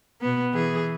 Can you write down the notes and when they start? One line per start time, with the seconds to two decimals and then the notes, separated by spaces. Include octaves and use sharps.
0.21 B2 B3
0.53 E3 G#4